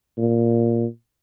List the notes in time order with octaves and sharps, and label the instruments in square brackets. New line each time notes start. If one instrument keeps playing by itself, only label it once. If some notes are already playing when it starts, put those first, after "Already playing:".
[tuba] A#2